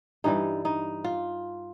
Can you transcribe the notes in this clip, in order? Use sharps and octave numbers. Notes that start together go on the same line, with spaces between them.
G2 E3 G3 D#4
D#4
F4